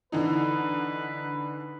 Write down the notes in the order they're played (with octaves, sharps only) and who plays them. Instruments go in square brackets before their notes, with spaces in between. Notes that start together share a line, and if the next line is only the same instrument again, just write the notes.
[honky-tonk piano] D3 E3 D#4 [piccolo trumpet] B4